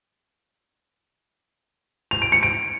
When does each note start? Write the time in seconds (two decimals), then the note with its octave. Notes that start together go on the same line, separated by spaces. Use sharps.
2.11 F7
2.22 D7
2.32 C#7
2.43 D7